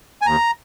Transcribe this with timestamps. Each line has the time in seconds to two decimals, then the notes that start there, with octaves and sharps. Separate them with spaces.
0.22 G#5
0.26 D#2 A#5